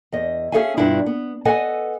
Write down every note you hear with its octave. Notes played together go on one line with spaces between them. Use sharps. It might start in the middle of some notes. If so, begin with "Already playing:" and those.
E2 D#5
C#4 G#4 A4 E5 F5 G#5
G2 B2 D4 E4 F4
B3
A4 B4 D#5 F#5 G#5